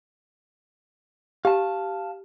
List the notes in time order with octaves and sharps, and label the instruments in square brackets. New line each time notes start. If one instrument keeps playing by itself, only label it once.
[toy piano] G4 [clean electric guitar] F5 A5